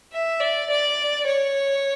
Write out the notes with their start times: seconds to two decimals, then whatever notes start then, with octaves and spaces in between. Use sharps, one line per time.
0.12 E5
0.40 D5
0.70 D5
1.26 C#5